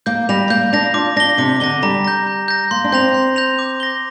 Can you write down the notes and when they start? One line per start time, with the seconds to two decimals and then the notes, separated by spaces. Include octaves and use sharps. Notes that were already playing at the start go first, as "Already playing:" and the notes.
0.06 A#3 G6
0.29 G3 A#6 F7
0.50 A#3 G6
0.73 D4 A#6 F7
0.94 F4 D6
1.16 D4 A#6 G7
1.38 C3 D6
1.60 D3 A#6 G7
1.82 G3 A#5
2.04 G6 A#6
2.27 A#5
2.48 G6 A#6
2.71 A#3 C6
2.84 D4
2.92 C4 G6 A#6 F7
3.14 C6
3.36 G6 A#6 F7
3.59 D6
3.80 A#6 G7